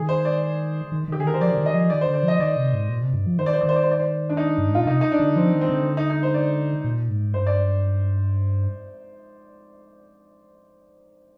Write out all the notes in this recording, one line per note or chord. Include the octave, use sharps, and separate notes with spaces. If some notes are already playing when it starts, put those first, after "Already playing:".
Already playing: D#3 G#4
C5
D5
D#3
D#3 G4
D3
G#4
D#3 A#4
C5
F3 D5
D3
D#3
D#5
F3
D#3 D5
C5
D3
D5
F3
D#5
D#3 D5
C3
G#2
A#2
C3
G2
F3
D#3 C5
D5
C5
D#3 D5
C5
D5
C5
D5
C5
D4
D#4
G2
G#2
A#2 F4
C3 D#4
D#4
D4
D3
F3 C4
D#3
C4
D3
D#4
D#4
C5
D5
A#2
G#2
G2 C5
D5